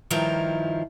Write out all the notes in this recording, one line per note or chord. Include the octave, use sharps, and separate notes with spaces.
G2 D#3 F3 E4 F4 A#5